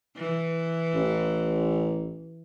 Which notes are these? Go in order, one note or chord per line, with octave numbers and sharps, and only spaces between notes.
E3
A1